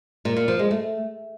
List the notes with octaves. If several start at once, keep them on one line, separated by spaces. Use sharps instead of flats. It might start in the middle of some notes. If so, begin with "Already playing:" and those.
A#2
A#2
F3
G#3
A3